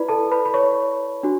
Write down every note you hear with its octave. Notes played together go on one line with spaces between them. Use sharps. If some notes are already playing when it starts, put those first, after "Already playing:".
Already playing: E4 B4 D5 B5
A4 A5
B4 B5
B5
C#5 C#6
D4 F#4